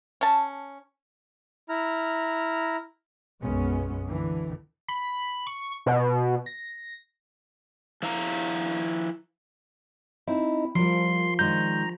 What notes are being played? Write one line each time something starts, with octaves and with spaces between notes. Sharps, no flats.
C#4 A5
E4 A#5 F6
B1 F#2 G#3 B3 C#4
D3 E3
B5
C#6
B2
A#6
F3 E4 F5 A5 A#5
C4 D#4 E4
F3 G3 A#4 C6
D#3 G#3 D4 A#5 G6